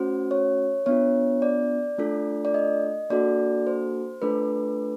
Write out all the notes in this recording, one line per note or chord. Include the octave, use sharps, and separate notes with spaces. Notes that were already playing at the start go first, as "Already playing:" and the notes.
Already playing: A3 C#4 F#4 C5
C#5
B3 D4 F4 C#5
D5
A3 D4 F4 A4
D5
D#5
A#3 D4 F#4 A4 D5
C5
A3 D4 F4 A4 B4